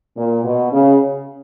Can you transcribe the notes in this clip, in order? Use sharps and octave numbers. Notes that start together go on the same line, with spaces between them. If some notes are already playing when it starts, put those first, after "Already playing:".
A#2
B2
C#3